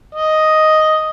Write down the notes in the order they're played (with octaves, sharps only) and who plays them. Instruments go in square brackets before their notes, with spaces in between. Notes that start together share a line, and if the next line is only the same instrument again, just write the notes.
[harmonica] D#5